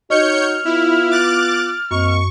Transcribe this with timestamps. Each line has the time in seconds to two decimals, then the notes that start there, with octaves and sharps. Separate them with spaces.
0.10 D#4 F#4 C#5 D#5 F6 G6 C#7
0.65 B3 E4 F4
1.11 D6 F#6 A6
1.91 F#2 A#3 C4 D#5 C#6